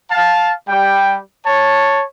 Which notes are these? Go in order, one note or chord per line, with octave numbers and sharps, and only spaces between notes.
F5 A5
G3 G5
C#5 A5